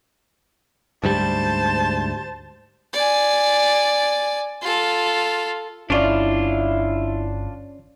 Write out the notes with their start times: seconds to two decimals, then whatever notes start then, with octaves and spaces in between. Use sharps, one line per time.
1.04 D2 G#2 G3 C5 A5
2.93 D5 G#5
4.62 F4 A4
5.90 G1 C#4 D4 E4 F4 C#5 D5